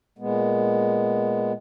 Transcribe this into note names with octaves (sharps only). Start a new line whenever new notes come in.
A#2 G#3 B3